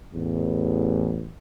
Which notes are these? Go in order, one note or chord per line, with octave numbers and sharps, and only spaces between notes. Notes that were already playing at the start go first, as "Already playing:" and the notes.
A1 E2